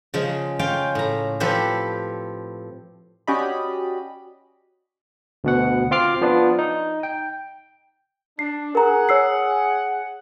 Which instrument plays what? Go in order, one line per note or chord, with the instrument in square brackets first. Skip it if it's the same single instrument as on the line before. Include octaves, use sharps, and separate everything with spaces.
[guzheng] C#3 F3 G#3
C#4 F4 F5 G5
A2 A#5
F3 C4 G4 A4 B4 C5
[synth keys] C#4 F#4 G4 D5 D#5 B5
[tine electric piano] D2 B2 F#5
C4 F4 C6 D6 F6 C7
F3 B3 D4 F4
D#4
G5
[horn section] D4 [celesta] C7
[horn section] G#4 F#5 [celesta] A#4 A#5
[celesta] C#5 E6 C7